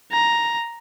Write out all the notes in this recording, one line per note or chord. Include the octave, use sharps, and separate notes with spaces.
A#5